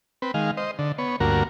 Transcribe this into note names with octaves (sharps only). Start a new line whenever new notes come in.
C4 B4
D#3 G#3 F5
C5 D#5
D3
B3 C#5
D2 G2 A#3 F#4 A#4